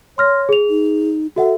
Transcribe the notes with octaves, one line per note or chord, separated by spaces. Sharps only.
C#5 C6 F6 A#6
G#4 F7
D#4
F#4 A4 E5 F#5